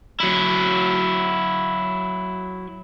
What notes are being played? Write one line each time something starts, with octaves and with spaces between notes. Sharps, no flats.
F#3 E4